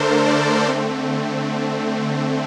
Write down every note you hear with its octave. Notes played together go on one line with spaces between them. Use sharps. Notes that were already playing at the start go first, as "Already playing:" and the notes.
Already playing: D3 A3 D4 A4 A#4 C5
D5
D3 A3 C4